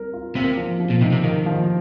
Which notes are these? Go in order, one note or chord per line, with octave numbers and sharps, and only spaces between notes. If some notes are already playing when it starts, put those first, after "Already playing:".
Already playing: G3 C4 A#4
F4
C3 A#3
F3
F3
A#2
C3 D#4
C3
D#3 A#3
F3